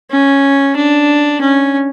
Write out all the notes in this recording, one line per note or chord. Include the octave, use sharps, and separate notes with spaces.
C#4
D4
C#4